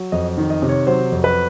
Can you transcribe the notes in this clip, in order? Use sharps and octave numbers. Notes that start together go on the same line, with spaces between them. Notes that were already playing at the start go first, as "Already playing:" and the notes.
Already playing: F#3
F2 D#5
D#3
D#5
C3
C#5
F#3 C5
F2
B4